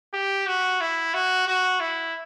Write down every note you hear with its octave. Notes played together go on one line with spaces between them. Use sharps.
G4
F#4
E4
F#4
F#4
E4